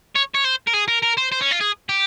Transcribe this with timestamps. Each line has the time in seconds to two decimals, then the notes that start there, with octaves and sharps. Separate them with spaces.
0.15 C#5
0.34 C#5
0.44 C5
0.67 A#4
0.73 G#4
0.88 A#4
1.02 A#4
1.17 C5
1.32 C5
1.41 C#4
1.51 F4
1.60 G#4
1.89 G4